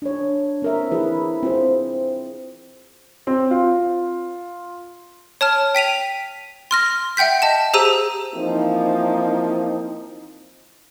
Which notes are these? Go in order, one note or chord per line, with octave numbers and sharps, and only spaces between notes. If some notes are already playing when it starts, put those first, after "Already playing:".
D4 C#5
C4 A#4 E5
E3 E4 G#4 B4
C4 F4 G#4 C5
C4
F4
C#5 A5 F6
G5 B6 D#7 F7
C6 F6 A#6
E5 F#5 G5 G6 B6
D#5 A5 E7
G4 G#4 C5 A#5 E6 D#7
E3 F3 A#3 C4 D#4